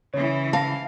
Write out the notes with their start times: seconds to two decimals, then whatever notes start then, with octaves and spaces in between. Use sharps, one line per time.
0.14 C#3 E3 C#5
0.53 F5 A5 A#6